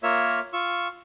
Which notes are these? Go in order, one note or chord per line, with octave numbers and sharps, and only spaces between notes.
A#3 F4 A#4 C#5 E5 E6
F4 C#6 E6